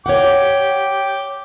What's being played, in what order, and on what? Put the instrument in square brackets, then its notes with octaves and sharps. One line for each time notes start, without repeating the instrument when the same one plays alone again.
[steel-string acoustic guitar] C#5 F#5 [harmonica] G5 D6